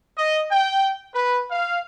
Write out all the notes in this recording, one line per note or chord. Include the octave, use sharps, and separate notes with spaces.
D#5
G5
B4
F5